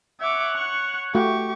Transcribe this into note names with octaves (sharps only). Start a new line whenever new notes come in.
C#5 E5 F#5 D6
C#6
A3 F#4 G4 C#6